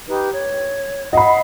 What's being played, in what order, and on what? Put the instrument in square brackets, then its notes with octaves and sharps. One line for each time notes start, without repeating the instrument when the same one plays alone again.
[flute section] D#4 G4 B4
C#5
[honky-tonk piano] D#5 B5 [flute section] F5 F#5